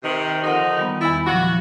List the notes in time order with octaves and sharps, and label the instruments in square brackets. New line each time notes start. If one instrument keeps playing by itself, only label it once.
[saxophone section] C3 D#3
[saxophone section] D3 F3 D#4 [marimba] A#4 F#5
[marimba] D#3 G3 B3
[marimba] E2 B5 A6 [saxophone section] E4
[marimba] A#2 F3 F#3 [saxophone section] F#4
[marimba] F3